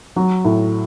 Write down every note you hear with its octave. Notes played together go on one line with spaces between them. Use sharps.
F#3
A2